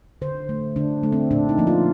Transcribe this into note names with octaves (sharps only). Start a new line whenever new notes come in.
D3 C5
A3
D3 D4
A3
C4
A#2 D4
D#4
F3 A#3
F4